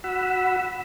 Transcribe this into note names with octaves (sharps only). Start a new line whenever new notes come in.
F#4 F#5 B5 E6